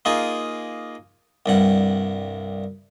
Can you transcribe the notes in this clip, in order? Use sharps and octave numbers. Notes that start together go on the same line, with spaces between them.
A#3 D#4 F4 G#4
C2 G2 F#5